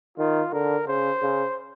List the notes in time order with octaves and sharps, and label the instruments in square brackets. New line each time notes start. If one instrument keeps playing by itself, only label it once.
[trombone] D#3 [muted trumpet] F4
[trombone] D3 [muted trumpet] A#4
[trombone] C#3 [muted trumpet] C5
[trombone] C#3